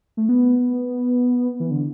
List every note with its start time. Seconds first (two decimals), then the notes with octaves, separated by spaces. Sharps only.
0.17 A3
0.29 B3
1.60 E3
1.71 D3